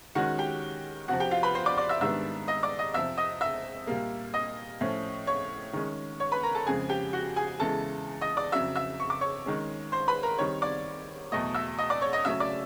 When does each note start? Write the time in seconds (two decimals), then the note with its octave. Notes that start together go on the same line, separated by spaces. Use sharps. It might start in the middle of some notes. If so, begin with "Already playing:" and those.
0.15 D#3 G#3 C#4 F#4 F#5
0.38 G4 G5
1.08 F2 C3 F3 F#4 F#5
1.20 G4 G5
1.31 F4 F5
1.43 B4 B5
1.55 C5 C6
1.66 D5 D6
1.78 D5 D6
1.89 E5 E6
2.01 G#2 D#3 G3 B3 D4 E5 E6
2.48 D#5 D#6
2.63 D5 D6
2.79 D#5 D#6
2.94 F2 C3 F3 E5 E6
3.18 D#5 D#6
3.41 E5 E6
3.87 A#2 G3 A#3
4.34 D#5 D#6
4.81 A2 F3 A3 C#4
5.27 C#5 C#6
5.73 D#3 G#3 C#4
6.20 C#5 C#6
6.32 B4 B5
6.43 A#4 A#5
6.55 A4 A5
6.67 F2 C#3 F3 G#3 G#4 G#5
6.89 G4 G5
7.13 F#4 F#5
7.36 G#4 G#5
7.60 E2 C#3 E3 G#3 A4 A5
8.21 D#5 D#6
8.37 D5 D6
8.52 F2 C#3 F#3 E5 E6
8.76 E5 E6
9.00 C#6
9.10 D6
9.21 C#5 C#6
9.46 D#3 G#3 C#4
9.92 C5 C6
10.08 B4 B5
10.23 A#4 A#5
10.38 D#3 G3 C4 C#5 C#6
10.62 D5 D6
11.32 E2 B2 F#3 A3 D#5 D#6
11.55 E5 E6
11.78 D#5 D#6
11.90 D5 D6
12.01 C#5 C#6
12.13 D#5 D#6
12.25 C#3 F#3 A3 C#4 E5 E6
12.40 D5 D6